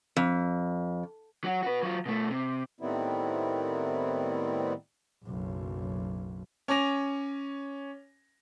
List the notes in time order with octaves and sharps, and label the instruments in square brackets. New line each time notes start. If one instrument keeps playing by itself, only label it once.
[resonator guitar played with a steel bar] F2
[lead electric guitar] F#3 F#4
F#4 B4
F#3 F4
B2 A3
C3
[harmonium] A2 D#3 G3 B3 C4 E4
[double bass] F#1 B1
[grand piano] C#4 G#5 D6 A#6 F7